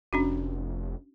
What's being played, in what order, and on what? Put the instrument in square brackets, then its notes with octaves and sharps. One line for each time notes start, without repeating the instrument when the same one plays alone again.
[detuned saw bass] F1 [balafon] C#4 D4 F#4